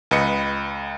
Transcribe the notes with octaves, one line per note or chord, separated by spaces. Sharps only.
C#2 B4 D#5 C#7